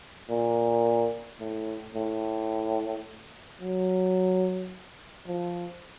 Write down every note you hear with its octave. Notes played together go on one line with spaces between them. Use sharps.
A#2
A2
A2
F#3
F3